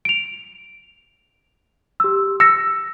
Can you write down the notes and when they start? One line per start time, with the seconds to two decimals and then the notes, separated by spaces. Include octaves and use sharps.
0.05 D7 F7
2.00 G4 E6
2.40 E6 A#6 C#7